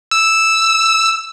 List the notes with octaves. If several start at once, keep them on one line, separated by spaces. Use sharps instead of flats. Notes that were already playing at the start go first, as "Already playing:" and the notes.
E6